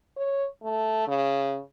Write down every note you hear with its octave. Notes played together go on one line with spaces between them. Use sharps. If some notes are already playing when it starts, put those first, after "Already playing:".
C#5
A3
C#3